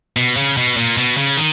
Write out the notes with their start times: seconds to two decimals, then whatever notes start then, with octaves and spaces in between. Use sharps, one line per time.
0.17 B2
0.37 C#3
0.57 B2
0.77 A#2
0.97 B2
1.17 C#3
1.37 D#3